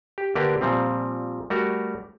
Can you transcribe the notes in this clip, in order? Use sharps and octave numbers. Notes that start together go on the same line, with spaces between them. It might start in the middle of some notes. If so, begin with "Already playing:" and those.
G4
D3 A#3 D4 G4 A#4 B4
A#2 F3 G3 C4
G3 A3 F#4 A#4